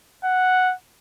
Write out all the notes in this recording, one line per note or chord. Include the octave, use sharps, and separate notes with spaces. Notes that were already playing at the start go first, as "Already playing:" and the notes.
F#5